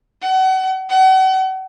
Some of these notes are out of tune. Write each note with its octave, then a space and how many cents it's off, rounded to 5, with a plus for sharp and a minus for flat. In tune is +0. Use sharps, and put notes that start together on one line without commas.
F#5 +35
F#5 +40